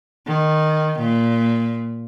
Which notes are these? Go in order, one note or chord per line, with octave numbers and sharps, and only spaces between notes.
D#3
A#2